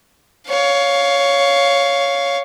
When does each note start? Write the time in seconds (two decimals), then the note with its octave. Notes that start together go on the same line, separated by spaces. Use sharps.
0.49 C#5 F5